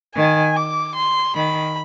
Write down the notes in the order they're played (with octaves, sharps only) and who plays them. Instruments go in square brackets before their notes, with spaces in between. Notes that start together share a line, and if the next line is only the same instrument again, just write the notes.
[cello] D#3 [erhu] G#5
[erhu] D6
C6
[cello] D#3 [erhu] B5